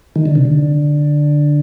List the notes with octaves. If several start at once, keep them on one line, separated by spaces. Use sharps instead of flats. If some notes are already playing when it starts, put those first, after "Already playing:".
D#3
D3
C3
D3